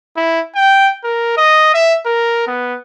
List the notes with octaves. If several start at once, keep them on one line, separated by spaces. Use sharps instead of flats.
E4
G5
A#4
D#5
E5
A#4
B3